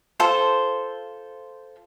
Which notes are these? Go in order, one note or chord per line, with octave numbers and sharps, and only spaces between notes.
F4 A4 C5